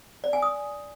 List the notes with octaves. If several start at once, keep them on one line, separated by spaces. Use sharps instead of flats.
D5
G#5
D#6